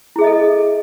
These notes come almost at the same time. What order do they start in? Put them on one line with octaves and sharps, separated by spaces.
E4 G#4 E5 D#5 A4